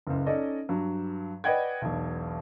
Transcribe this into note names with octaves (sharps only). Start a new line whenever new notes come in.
F#1 C#2
C#4 D#4 A4 D5 D#5
G2 F#3
B4 D5 D#5 F#5 G5 G#6
E1 B1